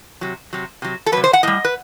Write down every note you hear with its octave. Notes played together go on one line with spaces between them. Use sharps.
C3 F#3
C3 F#3
C3 F#3
A4
C3 F#3 B4
C5
F#5
A2 G3 D#5
B4